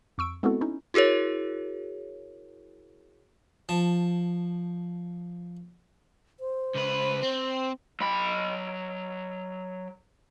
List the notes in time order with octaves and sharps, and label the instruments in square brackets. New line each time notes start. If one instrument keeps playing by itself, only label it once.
[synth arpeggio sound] F2 C#6 E6 D7
G#3 B3 C4 E4 F#4 A4
C#4 D#4 E4
[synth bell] E4 F#4 G#4 A#4 C#5
[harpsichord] F3 A5
[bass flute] C5
[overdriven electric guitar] C#2 B4
C4
[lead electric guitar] F#3 B5